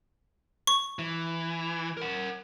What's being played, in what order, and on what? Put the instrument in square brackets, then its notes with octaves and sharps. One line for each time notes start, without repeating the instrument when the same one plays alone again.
[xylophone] C#6
[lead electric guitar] E3
A#4 F#5